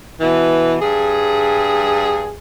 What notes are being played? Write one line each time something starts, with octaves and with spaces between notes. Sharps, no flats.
B2 E3
G2 G#4